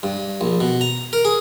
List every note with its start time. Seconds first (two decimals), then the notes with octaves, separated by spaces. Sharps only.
0.03 G2
0.41 A#1
0.60 B2
0.81 A#5
1.13 A#4
1.25 G#4